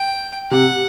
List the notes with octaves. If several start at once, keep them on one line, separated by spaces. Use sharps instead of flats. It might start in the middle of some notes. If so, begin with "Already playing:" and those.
Already playing: G5
C3 F#5